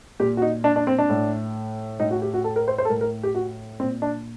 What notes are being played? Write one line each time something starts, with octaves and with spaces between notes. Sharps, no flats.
A#2 G4
F#4
D#4
D4
D4
C4
D4
A2
A2 D#4
F#4
G4
F#4
A4
A#4
C5
C5
A4
A2 A#4
A#4
G4
F#4
A#2 C4
D4